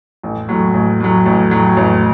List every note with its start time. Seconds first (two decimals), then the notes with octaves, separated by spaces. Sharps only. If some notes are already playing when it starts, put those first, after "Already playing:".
0.23 A1
0.49 A2 F#3
0.74 A1
1.00 A2 F#3
1.26 A1
1.51 A2 F#3
1.77 A1